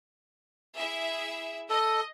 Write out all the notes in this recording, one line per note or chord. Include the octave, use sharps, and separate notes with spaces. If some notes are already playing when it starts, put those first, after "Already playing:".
E4 G#4 E5
A4 D#5